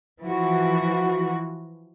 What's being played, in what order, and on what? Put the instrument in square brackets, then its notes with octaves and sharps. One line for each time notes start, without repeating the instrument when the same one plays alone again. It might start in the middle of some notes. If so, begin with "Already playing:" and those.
[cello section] E3 F3 F#4